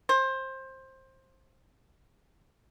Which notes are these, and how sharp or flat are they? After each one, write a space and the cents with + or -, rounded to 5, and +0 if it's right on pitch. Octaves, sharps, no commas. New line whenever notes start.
C5 +20